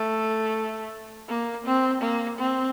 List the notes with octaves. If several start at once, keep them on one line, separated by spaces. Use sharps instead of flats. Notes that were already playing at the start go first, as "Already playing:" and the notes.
Already playing: A3
A#3
C4
A#3
C4